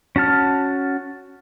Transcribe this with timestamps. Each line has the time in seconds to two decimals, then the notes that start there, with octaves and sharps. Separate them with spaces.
0.16 C#4 F#4 A5 F6